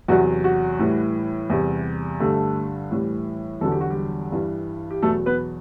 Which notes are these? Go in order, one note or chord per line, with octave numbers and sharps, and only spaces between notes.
E2 C3 F#3 F#4
F#4
A2 E3 G3
E2 C3 G3
G2 D3 G3 A3 A4
A2 E3 G3
E2 D3 F#3 A4
G4
F#4
G3 G4
G2 E3 G3
G4
E2 B2 F#3 A3 A4
B3 B4